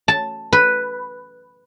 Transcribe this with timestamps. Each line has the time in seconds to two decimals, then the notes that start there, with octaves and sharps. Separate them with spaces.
0.08 A5
0.53 B4